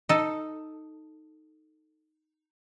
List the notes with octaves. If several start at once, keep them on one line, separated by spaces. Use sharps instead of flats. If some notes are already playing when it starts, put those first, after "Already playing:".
D#4 A4